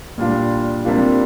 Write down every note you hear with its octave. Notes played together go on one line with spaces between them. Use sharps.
A#2 G3 D4 F4
C3 G3 A#3 D4 F4